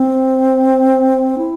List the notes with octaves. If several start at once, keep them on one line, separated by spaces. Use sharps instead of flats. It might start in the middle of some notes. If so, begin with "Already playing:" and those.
Already playing: C4
E4